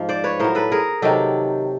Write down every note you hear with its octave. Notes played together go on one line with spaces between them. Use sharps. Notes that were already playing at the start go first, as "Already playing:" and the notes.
Already playing: G#2 F3
C5 D5
B4 C#5
A2 F#3 A#4 C5
A4 B4
G#4 A#4
C3 D#3 F#3 G4 A4